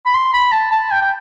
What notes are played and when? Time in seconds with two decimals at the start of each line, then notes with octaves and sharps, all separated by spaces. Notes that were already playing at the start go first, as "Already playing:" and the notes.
0.06 B5
0.14 C6
0.33 B5
0.52 A5
0.72 A5
0.92 G5
1.02 G5